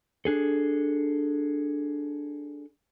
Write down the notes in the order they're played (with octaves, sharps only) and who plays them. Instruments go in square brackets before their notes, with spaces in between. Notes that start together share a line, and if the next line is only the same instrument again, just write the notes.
[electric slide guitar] D4 G#4 A4